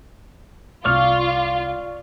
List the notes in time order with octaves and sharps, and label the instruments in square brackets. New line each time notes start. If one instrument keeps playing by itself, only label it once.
[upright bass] C2 C3 [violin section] F4 [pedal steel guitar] D5 C#6 F6